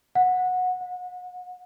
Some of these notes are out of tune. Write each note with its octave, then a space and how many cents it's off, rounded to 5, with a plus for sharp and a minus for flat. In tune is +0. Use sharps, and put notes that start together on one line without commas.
F#5 -15
F#5 -35